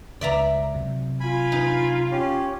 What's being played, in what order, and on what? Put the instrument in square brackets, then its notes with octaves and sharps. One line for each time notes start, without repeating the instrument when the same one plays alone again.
[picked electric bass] C#2 [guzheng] D5 E5 A#5
[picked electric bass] C3 F#3
[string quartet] F4 [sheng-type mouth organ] G#5 B5
[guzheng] D#4
[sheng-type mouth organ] C#4 G4